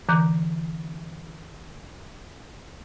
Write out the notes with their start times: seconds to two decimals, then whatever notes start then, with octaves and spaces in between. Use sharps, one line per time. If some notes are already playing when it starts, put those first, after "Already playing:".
0.09 D3 E3 A#5 D6 F#6 G6